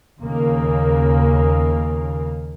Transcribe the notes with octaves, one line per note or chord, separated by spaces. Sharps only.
D#2 C#3 A#3